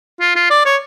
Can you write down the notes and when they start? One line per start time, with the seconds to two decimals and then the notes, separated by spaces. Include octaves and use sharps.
0.20 F4
0.36 F4
0.50 D5
0.65 C#5